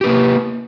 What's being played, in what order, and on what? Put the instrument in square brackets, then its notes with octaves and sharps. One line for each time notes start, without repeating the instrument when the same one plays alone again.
[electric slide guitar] G4
B4
A#3